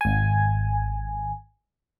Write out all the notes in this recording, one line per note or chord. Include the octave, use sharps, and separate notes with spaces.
G#1 G#5